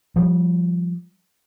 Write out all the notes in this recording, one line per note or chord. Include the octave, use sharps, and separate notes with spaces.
F3 G3